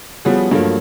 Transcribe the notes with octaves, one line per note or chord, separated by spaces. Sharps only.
F3 G3 B3 C#4 F#4 G#4
G2 F3 F#3 A3 A#3